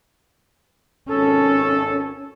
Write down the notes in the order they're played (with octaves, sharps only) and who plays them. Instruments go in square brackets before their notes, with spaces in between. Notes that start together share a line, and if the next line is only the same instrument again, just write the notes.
[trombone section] G#1 A4 [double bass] C#4